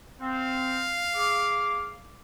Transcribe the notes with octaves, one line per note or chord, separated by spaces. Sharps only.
C4 F5
G#4 D6